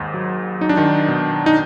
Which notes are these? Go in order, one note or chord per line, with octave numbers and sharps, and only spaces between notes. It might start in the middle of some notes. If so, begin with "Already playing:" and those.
Already playing: D#2 G#2
F#3
F#3 D#4
D4
D#3 D#4
B2
D#4